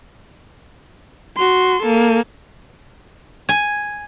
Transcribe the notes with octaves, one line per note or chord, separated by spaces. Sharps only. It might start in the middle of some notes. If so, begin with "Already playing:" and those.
F#4 C6
A#3 A4
G#5